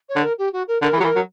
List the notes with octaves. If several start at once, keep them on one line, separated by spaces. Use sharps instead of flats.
C#5
D3
A#4
G4
F#4
A#4
D3 A#4
E3
F#3 G4
E3 A#4
F#3